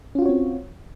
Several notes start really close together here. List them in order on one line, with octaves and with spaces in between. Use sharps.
C#4 F4 F#4 C#5 C4